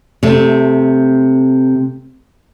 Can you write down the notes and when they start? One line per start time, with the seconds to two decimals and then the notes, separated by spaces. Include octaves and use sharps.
0.23 C3 A3